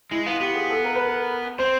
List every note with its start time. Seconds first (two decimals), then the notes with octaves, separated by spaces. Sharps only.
0.11 G#3 E4
0.26 B3 F4
0.40 B3 G4
0.56 G#4
0.70 A4
0.85 A#4
0.96 B4
1.06 A#4
1.59 C4 C5